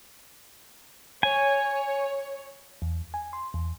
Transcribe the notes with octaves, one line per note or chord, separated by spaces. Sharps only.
C#5 G#5
E2
G#5
C6
E2